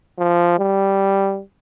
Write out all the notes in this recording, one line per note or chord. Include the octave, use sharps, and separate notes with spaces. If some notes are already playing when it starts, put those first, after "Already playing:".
F3
G3